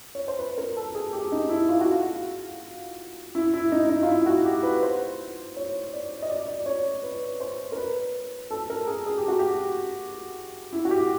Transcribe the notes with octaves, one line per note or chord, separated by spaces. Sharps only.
C#5
C5
B4
A#4
A4
G#4
G4
D#4
E4
F4
F#4
F4
E4
E4
D#4
D#4
F4
E4
F4
F#4
G4
B4
C5
C#5
D5
D#5
D5
D5
C#5
B4
C5
A#4
B4
A4
A#4
G#4
G#4
G4
F#4
G4
E4
F#4
G4